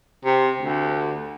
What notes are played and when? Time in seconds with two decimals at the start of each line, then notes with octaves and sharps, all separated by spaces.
0.25 C3
0.60 D2